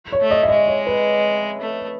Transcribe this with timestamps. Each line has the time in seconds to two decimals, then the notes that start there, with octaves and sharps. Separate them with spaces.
0.12 C#5
0.21 A3
0.31 D#5
0.43 E5
0.49 G#3 D#5
0.68 C#5
0.87 B4
1.61 A3